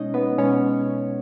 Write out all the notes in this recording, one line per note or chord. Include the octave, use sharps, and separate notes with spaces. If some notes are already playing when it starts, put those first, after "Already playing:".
Already playing: B2 G#3 B3 C#4 D#4 C#5 D#5
B3 B4
B2 G#3 B3 C#4 C#5